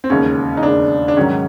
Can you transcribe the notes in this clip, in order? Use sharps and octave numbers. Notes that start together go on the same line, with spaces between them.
C4
E1 D#2 C#3 C#4
D#4
E1 D#2 C#3 D4
D4
G#2 D#3 F#3 C#4